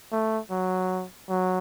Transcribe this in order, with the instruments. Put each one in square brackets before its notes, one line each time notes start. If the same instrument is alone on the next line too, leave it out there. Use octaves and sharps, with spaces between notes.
[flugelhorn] A3
F#3
F#3